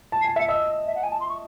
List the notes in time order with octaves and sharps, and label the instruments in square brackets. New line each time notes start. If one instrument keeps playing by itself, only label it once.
[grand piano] A5
[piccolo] C7
[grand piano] G#5
E5
[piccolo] C#7
[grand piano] D#5 [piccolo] E6
[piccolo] E5
F#5
G#5
A5
C6
C#6